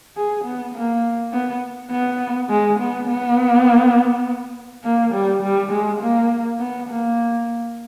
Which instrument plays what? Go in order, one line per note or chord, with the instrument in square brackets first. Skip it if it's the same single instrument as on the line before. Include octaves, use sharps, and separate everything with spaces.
[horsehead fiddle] G#4
B3
A#3
B3
B3
G#3
B3
B3
A#3
G3
G3
G#3
A#3
B3
A#3